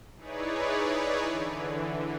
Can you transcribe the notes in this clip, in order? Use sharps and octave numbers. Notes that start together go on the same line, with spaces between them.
D#4 E4 G#4 B4 C#5 D5
D3 E3